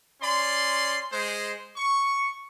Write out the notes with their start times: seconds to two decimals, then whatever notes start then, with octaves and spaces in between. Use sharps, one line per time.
0.21 C#4 D5 C6
1.12 G#3 C5
1.77 C#6